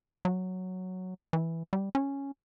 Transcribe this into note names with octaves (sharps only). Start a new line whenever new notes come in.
F#3
E3
G3
C#4